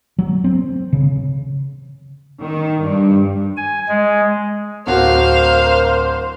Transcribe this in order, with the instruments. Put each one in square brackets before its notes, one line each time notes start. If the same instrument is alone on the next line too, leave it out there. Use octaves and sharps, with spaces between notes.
[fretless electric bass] F#3
C4
C#3
[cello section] D#3
G2
[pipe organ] G#5
G#3
[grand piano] D1 F#4 [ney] A#4 [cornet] C5 [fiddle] F5